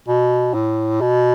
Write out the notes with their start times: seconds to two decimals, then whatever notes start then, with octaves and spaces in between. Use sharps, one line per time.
0.08 B2
0.54 A2
1.01 B2